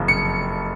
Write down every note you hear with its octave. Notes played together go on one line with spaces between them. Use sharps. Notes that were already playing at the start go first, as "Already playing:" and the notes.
Already playing: F#1 F2 F3
C#7